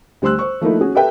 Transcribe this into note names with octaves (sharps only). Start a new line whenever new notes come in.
D2 G3 C5 C6 E6 F#6
C5 C#6
F3 A3 A#3 D#4 E4
C#4 F#4 G#4
G4 A4 B4 E5 G5